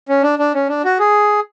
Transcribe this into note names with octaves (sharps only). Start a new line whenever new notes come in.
C#4
D4
D4
C#4
D4
F#4
G#4